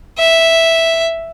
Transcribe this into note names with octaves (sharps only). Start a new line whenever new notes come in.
E5